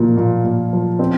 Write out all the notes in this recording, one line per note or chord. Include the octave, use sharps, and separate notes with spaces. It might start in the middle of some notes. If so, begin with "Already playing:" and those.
Already playing: A#2 F3 A#3
A#2
A#2
F3
C4